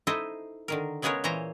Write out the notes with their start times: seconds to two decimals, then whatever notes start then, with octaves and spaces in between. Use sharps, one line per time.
0.07 D#4 E4 A4 C5 D#5
0.68 D3 D#3 A#4
1.02 C#3 G#3 B3 G#4 A#4 C#5
1.24 A#2 E3 C5 C#5 A#5